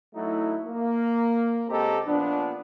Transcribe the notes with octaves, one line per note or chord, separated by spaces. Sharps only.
F#3 A3 D#4 E4
A#3
C#2 C4 G4 A4 D#5 A#5
A#2 F3 B3 D4